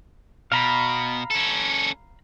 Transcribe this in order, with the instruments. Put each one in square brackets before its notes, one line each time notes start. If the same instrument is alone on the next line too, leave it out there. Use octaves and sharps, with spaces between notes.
[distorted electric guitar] B2 [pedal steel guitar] F5 A#5 B5
[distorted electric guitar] C#4 A4